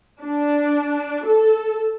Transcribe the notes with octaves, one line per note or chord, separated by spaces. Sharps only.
D4
A4